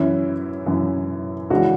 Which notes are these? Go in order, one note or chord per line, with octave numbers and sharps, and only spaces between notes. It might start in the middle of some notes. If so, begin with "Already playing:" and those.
Already playing: F#2 E3 C#4 E4
F#2 E3
C#2 C#3 E3 D4 F#4